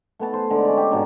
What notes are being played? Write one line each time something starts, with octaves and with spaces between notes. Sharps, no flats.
A3 B3 A5
C5
D3 G#3
C#4 D5
G4
G#2 B2 D3 D#4